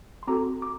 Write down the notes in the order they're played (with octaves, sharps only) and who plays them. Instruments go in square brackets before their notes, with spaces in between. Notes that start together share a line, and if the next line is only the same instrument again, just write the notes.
[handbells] C6
C4 F#4 A4 A#5 D6
D6